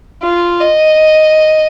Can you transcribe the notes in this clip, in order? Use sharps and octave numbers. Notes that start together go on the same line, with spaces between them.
F4
D#5